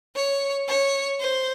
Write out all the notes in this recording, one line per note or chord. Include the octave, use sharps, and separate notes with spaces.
C#5
C#5
C5